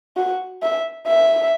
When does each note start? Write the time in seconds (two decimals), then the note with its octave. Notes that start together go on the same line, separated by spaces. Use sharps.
0.17 F#4
0.62 E5
1.07 E5